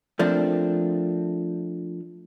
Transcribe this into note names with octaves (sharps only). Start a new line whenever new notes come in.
F3 A3 A#3 C4 D4